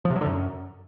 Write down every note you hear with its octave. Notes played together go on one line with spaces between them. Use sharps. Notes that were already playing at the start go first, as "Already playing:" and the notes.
F3
C3
F#3
D3
F#2